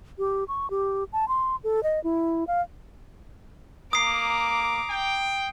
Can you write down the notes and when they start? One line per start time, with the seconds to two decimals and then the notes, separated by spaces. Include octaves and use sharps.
0.19 G4
0.48 C#6
0.70 G4
1.13 A5
1.28 C6
1.64 A4
1.83 D#5
2.04 E4
2.47 F5
3.93 A#3 A#5 D6 D#6 C7
4.90 G5